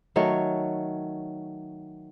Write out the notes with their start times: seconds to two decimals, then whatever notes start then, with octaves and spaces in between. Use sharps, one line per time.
0.16 D#3 F#3 A3 C#5